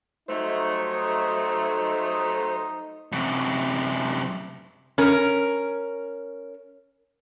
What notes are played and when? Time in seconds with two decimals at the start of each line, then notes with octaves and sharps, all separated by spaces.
0.28 F#3 G3 A3 D#4 C5
3.12 F#2 C3
4.98 C#4 A#4